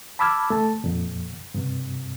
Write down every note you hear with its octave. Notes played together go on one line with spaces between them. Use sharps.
A5 B5 D6 E6 F6 G#6
A3 A5
F2 A#2
G2 C3